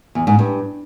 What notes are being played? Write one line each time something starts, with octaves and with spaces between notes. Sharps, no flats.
E2
G#2
G2